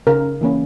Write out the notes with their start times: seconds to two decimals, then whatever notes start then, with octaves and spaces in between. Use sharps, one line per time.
0.07 C#3 A#4
0.41 E3 A#3 C#4